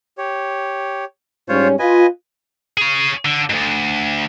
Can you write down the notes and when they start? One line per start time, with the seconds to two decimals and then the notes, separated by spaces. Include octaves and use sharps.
0.18 G4 C#5
1.49 G#2 G3 C#4 F4 C5 C#5
1.79 F4 B4 D#5 G#5
2.78 G#4 C#5
3.25 D3
3.50 D2 G#2